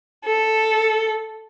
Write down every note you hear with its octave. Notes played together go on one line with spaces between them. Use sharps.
A4